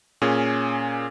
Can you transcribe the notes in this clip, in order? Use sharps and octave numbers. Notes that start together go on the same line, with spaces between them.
A#2 C#4 G#4